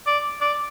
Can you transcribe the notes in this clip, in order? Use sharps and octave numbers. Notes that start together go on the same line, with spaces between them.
D5
D5